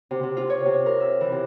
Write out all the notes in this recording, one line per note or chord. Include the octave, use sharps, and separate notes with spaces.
C3
C3
F4
C#5
C3
A#4
E5
E3
C3